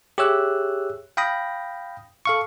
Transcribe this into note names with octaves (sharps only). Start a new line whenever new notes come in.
G4 G#4 C#5 E5 E6 F#6
F5 G5 B5 D#6 A#6
A4 F5 C#6